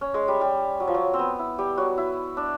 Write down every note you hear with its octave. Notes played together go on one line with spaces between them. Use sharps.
C#4
G#3
G3
G3
F#3
F3
F#3
C4
B3
E4
G3 G4
F#3 F#4
E4
D4